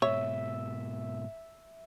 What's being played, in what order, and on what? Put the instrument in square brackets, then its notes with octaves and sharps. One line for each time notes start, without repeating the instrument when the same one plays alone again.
[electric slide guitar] G#2 B2 [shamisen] C#5 [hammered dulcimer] E5